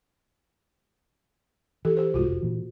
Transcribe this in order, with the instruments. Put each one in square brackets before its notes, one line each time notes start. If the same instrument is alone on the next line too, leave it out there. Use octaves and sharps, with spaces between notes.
[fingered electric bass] E3 [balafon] G4 A4
[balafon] G4 C5
[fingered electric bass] C2 G#2 [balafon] F4 F#4
[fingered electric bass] F1
A#2 E3